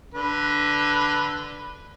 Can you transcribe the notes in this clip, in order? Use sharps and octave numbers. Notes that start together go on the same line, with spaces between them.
D3 B4